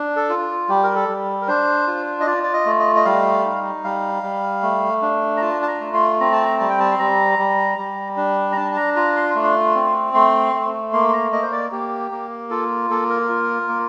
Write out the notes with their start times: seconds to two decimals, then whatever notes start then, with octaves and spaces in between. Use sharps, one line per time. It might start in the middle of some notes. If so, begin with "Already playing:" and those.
Already playing: D4
0.16 A4
0.30 F4
0.69 G3 G4
0.83 A#4
0.95 A4
1.08 G3
1.42 A#4
1.48 D4 C5
1.87 F4
2.21 D#5
2.26 F4 D5
2.43 D5
2.53 D#5
2.66 A3
2.79 D#5
2.96 D#5
3.05 G3 F5
3.45 D#4
3.84 G3 F5
4.23 G3
4.62 A3
5.02 D4
5.37 A#5
5.41 F4 A5
5.62 A5
5.68 A#5
5.81 A3
5.94 C6
6.20 C4 A#5
6.32 A5
6.45 A#5
6.60 G3 A5
6.70 G5
6.80 A5
6.91 C6
6.99 G3 A#5
7.39 G3
7.78 G3
8.17 D4
8.52 A#5
8.57 D4 A5
8.72 A5
8.76 A#5
8.96 F4 A#5
9.16 C6
9.35 A3
9.43 C6
9.75 C4
10.14 A3 C6
10.54 A3
10.93 A#3 C6
11.09 C6
11.13 A#5
11.32 A#3 D#5
11.42 C5
11.52 D5
11.72 A#3 G4
12.11 A#3
12.50 F4 A4
12.90 A#3 A4
13.10 A#4
13.29 F4
13.68 A#3